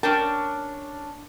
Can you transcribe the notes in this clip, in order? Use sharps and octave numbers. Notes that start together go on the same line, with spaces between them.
C#4 D4 A#4 G5 A5